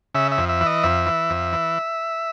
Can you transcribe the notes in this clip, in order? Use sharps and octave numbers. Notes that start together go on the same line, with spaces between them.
C#3 E5
E5
F2
E5
E3
D#5
F2 E5
E3
F2
E3